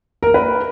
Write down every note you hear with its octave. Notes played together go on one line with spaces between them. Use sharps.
A#4
B4